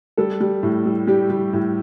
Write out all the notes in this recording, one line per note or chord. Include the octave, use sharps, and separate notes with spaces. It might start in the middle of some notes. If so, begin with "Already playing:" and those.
G3 A4
G3
A2
G3
G3 G4
G3
A2